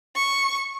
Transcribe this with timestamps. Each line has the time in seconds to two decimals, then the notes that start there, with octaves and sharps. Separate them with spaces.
0.15 C#6